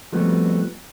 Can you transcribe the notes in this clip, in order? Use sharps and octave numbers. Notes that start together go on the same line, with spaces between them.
F3 G3 A3 B3 C4 F#4